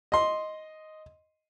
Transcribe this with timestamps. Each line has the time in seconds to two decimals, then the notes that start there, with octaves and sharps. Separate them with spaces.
0.12 D#5 C6